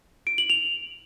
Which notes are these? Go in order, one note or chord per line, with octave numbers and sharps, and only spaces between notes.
D7
F#7
F7